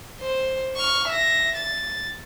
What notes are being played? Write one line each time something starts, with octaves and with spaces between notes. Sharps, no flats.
C5
C#6 F6
E5 A#6
A6